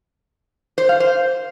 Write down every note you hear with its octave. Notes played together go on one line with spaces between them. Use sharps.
C5
F5
C5